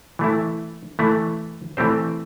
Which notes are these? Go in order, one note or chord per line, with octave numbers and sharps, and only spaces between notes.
E3 A3 E4
E3 A3 E4
E3 A3 C4 G4 C5